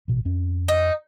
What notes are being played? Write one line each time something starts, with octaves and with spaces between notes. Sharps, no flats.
A1 B2
F2 C#4
D#4